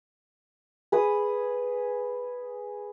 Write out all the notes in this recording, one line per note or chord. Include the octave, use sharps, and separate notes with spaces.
G#4 B4 D#6